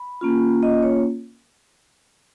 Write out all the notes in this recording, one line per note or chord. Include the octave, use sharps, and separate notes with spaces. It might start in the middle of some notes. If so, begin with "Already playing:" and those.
Already playing: B5
A#3 C#4 F4
D#5
C#5